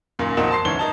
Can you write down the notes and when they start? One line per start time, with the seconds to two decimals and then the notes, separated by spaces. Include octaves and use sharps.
0.19 F#2 A#2 D#3
0.37 A#1 F2 A#2 D#4 F#4 E7
0.51 A5 C6 C7
0.65 D1 G#2 E3 C#4 G7
0.79 D#3 D#4 A5